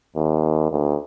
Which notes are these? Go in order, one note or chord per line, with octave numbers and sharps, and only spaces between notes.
D#2
D2